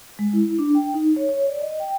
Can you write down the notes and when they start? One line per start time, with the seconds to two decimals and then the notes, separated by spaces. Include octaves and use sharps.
0.19 G#3
0.33 E4
0.59 D4
0.75 G5
0.94 D#4
1.16 C#5
1.29 C#5
1.47 D5
1.61 D#5
1.80 G5